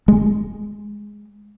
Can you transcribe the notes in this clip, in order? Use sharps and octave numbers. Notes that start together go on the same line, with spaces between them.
G#3